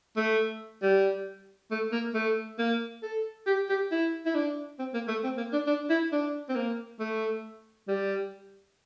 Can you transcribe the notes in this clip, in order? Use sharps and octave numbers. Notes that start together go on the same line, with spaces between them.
A3
G3
A3
A#3
A3
A#3
A4
G4
G4
E4
E4
D4
C4
A#3
A3
C4
A#3
D4
D4
E4
D4
C4
A#3
A3
G3